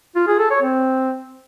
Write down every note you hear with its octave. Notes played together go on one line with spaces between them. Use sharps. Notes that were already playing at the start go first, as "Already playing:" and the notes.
F4
G#4
A4
C#5
C4